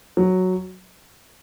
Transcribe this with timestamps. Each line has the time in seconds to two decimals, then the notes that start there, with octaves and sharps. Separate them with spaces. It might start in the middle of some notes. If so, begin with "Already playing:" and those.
0.17 F#3